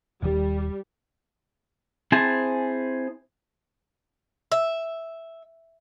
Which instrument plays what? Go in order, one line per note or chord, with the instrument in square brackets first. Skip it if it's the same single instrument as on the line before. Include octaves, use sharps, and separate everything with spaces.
[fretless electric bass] D#1 D#2 D#3 [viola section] G3
[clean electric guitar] C4 E4 G#4 C5 G#5 A5
[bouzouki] E5